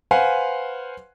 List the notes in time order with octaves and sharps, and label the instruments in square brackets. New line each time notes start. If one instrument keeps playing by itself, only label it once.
[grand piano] B4 C5 F5 F#5 G#5 C6